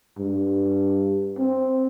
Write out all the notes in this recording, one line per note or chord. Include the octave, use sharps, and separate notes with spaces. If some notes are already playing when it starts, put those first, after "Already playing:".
G2
C4